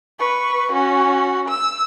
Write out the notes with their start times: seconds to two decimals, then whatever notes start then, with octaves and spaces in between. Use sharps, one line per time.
0.19 B4 C#6
0.72 C#4 F#4
1.49 E6